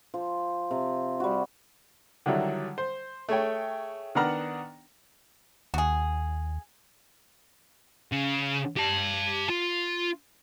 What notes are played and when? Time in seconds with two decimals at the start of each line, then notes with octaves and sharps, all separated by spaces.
0.14 F3
0.71 C3
1.20 G3 F#4
2.26 D3 D#3 F#3 G3 E4
2.78 C5
3.29 A3 G#4 C#5 G5
4.15 D#3 B3 D4 F#5 A#5 F6
5.74 D#2 F#4 G#4
8.12 C#3
8.77 G4 A5
9.50 F4